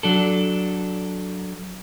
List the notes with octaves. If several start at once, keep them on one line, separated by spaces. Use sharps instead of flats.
F#3 D4 A4